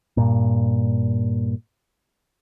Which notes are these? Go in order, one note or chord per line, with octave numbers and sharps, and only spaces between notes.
G2 A#2